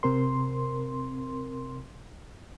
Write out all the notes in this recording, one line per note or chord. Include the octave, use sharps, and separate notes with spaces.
C3 C4 A#4 C6